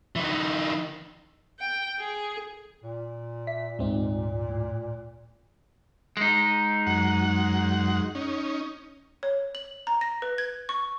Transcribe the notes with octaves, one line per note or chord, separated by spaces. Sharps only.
E3 D#4
G5
G#4
A#2
E5 B6
D2 G#2 G#3 C4 D#4
A2
G#3 D#4
F#2 F#5
C#4 D#4
C#5
F#7
A#5
A#6
B4
G#6
C#6